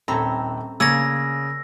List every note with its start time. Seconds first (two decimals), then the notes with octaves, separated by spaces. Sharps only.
0.08 D#1 C4 C#4 A4 A#5 B5
0.80 C#3 A#3 C#5 D5 G#5 E6 A#6